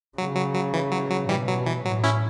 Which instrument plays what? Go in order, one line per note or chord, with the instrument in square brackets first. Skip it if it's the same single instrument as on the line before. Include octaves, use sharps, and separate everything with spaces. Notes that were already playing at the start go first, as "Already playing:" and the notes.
[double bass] C#3 [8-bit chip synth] F#3
[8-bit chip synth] F#3
F#3
E3
F#3
F#3
[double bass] B2 [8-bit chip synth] E3 G3
[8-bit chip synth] F#3
E3
[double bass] A2 [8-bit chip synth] F#3
[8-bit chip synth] C#4 E4